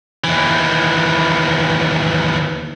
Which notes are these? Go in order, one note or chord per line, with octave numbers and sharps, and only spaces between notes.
D#2 E3